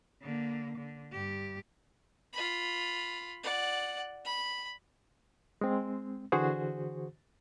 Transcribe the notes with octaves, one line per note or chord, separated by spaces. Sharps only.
D3 A#3
D3
G2 G4
F4 B5
D5 F#5
B5
G#3 C4
D3 E3 F#4 G#4 C5